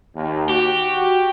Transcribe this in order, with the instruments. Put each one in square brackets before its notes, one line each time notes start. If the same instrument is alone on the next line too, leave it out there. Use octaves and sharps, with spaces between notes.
[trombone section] D#2
[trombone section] F#4 [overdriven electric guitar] G4